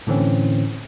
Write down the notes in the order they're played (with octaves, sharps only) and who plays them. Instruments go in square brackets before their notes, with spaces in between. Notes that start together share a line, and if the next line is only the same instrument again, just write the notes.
[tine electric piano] A2 D3 E3 C4 C#4